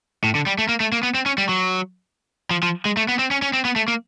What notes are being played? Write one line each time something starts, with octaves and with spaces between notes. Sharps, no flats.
A2
D3
G3
A3
A#3
A3
A#3
B3
C4
C#4
G3
F#3
F3
F3
G#3
A3
B3
C4
C#4
C#4
C4
B3
A3
A#3